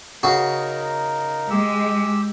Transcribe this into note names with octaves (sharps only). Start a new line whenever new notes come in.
C#3 D#4 F#4 A#4
G#3 G4 E6